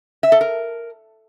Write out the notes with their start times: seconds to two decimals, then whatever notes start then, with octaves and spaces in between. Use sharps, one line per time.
0.23 E5
0.32 A4
0.41 A#4